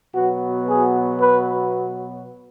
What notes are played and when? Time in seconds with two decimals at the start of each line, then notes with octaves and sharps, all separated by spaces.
0.14 B2 F#3 B3 F#4
0.68 G#4
1.21 B4